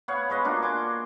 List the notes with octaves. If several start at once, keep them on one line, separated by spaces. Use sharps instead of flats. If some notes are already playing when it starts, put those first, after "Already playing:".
B3 C#5 F5 F#5
G#3 B4 D#5 F5
A#3 D4 F4 F#4
G#5 C6 D6